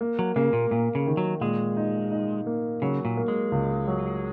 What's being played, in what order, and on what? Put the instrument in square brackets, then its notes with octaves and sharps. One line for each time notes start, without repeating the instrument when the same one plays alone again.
[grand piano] A#3
[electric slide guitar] F#3
[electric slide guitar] C#3 [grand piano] A#3
[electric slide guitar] A#2
[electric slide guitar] A#2 [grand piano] A#3
[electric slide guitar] C#3
[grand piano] D#3
[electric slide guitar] F#3
[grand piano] A#2 [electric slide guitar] G#3
[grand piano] D#4
D#4
A#3
[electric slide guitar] C#3 [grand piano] F#3
[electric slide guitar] A#2
[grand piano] A#3
[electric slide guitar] G#3
[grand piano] C#2
F#3